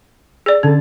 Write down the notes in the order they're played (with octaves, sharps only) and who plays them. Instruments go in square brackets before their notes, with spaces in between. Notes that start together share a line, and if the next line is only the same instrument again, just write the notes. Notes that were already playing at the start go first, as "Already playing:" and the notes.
[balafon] G#4 D5
[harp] D3 A5 [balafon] C#4